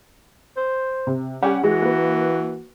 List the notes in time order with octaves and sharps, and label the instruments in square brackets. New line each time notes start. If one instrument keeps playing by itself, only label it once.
[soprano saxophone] C5
[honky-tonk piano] C3
[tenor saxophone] G3 [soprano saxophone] C#4 [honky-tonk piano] G4 F#5
[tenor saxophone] E3 [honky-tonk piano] G#3 [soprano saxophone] F#4
[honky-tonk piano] A#3 B4